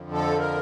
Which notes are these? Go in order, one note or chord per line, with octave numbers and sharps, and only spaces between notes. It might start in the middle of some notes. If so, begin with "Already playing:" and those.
Already playing: F2 D3 F3
A4
A#4